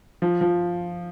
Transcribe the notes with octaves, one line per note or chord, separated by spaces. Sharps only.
F3
F3